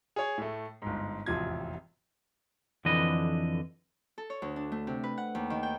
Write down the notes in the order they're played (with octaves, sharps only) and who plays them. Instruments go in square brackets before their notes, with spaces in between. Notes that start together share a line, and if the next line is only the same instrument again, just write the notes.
[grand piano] G#4 C#5
A2 A3
G1 G#2
E1 A1 F2 C3 F4 G#6
[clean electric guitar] F2 D3 E3 B4 D#5
[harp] A4
C#5
D2
D4
A3
C3
B4
F#5
D#2
D#3
G5